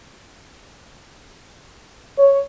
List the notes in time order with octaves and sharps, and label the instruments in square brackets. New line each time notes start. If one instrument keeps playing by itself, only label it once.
[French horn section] C#5